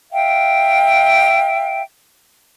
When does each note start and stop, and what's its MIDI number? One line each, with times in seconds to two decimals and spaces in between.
0.12 1.82 76
0.12 1.82 77
0.12 1.82 79